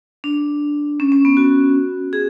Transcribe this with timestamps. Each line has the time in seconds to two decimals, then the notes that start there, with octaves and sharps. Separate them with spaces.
0.24 D4
1.00 C#4
1.12 C#4
1.25 B3
1.37 F#4
2.13 G#4